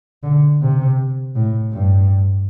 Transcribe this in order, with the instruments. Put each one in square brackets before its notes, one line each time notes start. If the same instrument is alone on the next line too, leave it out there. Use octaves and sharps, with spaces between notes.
[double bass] D3
C3
A2
G2